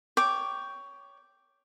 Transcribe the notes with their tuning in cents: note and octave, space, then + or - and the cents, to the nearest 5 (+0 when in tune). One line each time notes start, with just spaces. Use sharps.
C#5 +15 G5 +0 D6 +0